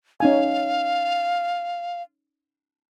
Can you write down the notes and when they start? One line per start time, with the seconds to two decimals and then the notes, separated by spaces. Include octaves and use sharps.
0.20 C#4 D#4 F5 G#5